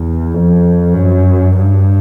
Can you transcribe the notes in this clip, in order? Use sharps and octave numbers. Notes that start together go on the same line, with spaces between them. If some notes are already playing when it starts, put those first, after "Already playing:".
Already playing: E2
F2
F#2
G2